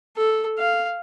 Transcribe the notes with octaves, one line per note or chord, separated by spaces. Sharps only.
A4
F5